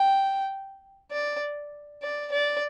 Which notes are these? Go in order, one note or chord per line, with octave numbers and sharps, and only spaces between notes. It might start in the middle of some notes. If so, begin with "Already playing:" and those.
Already playing: G5
D5
D5
D5